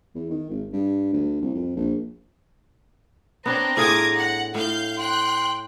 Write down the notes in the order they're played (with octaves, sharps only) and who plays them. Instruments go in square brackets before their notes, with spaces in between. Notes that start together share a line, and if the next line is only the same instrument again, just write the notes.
[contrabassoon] E2
D#3
G#1
G2
D2
C2
F2
A#1
[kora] B3 D4 C#5 [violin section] C4 [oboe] A#5
[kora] A2 F4 G#4 [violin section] D6 D#6 G#6
[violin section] F#5
[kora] A2 [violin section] F5 G6
[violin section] G5 F#6 [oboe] C6